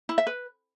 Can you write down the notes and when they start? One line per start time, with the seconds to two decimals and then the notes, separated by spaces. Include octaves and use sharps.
0.09 E4
0.18 E5
0.27 B4